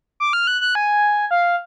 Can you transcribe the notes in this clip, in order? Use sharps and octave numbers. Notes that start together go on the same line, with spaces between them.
D6
F6
F#6
F#6
G#5
F5